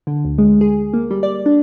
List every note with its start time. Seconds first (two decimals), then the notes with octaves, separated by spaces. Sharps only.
0.07 D3
0.25 D2
0.38 G#3
0.61 G#4
0.94 A#3
1.11 G3
1.23 D5
1.46 D4